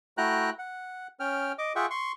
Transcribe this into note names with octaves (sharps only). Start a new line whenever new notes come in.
A3 E4 F#4 G5 A#5 F#6
F#5
C#4 G5 F6
D#5 D6
F4 G#4 E5 F#5 G5 C#6
C6 C#6